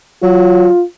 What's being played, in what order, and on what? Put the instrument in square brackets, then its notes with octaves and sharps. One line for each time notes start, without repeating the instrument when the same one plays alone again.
[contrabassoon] F#3 [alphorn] F4